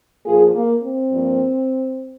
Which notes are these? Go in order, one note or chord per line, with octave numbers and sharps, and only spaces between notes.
A#2 F3 A#3 F4 G#4
A#3
C4
G2 F3 A#3